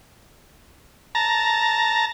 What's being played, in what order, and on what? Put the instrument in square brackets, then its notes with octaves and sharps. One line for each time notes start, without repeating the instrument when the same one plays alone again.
[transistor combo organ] A5 A#5